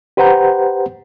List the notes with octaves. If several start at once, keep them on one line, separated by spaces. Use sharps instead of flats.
G4 B4 C5 F#5 A#5 G6